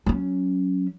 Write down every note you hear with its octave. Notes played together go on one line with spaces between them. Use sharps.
F#3 C#4